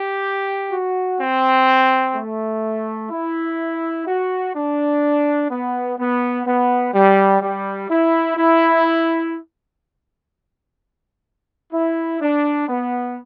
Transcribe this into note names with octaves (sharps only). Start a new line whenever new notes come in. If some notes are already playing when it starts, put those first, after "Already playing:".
Already playing: G4
F#4
C4
A3
E4
F#4
D4
B3
B3
B3
G3
G3
E4
E4
E4
D4
B3